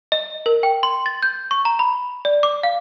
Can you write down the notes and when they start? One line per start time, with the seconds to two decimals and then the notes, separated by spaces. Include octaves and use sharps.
0.12 D#5
0.46 A#4
0.63 G5
0.83 C6
1.06 A6
1.22 G6
1.51 C#6
1.65 A#5
1.79 B5
2.25 D5
2.43 D6
2.63 F5